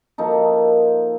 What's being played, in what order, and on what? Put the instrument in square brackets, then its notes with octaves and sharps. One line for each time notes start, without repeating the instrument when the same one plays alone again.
[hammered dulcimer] F3 A#3 D#4 A4